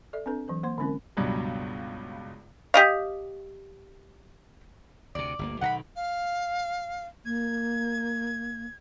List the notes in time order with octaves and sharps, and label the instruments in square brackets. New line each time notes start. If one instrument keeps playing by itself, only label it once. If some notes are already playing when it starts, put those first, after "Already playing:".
[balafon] A4 D5 E5
C4 D4 A4 B4
E3 F#3 B4
A#3 C5 C6
D3 G#3 C4 C#4 E4 A#4
[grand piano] C#2 G2 B2 F#3 G3
[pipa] G4 D#5 F5
[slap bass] D2 C3 [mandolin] D5
[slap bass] G1 D2 A#3
[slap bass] B1 D#3 [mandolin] F#5 A#5 B5
[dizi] F5
[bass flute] A#3 [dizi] G#6